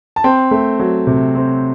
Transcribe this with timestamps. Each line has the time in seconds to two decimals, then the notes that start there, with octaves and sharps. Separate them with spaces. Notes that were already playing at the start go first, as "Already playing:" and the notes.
0.16 A5
0.24 C4 G5
0.51 A3
0.79 F#3
1.07 C3
1.35 C4